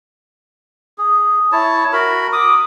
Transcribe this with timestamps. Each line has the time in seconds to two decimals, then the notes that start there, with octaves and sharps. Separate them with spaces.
0.98 G#4
1.52 E4 C#5 A5
1.93 F#4 A#4 B5
2.32 D6 D#6